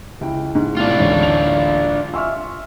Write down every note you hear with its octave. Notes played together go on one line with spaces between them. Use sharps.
C#2 E4 G5
G#2
A2 C3 D4 F4
A1 D2 G#2 C#4
F7
E5 G#5 C6 C#6 E6 F6